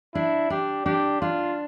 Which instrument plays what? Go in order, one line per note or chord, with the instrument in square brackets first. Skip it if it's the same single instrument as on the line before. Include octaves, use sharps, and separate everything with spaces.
[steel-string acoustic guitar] D4 [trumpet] E4
[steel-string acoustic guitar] D4 [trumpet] G4
[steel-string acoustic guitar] D4 [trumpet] G4
[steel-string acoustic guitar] D4 [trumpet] F4